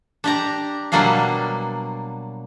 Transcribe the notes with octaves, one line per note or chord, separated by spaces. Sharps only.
D4 G4 A#5
B2 F#3 G3 A#3 D4 F5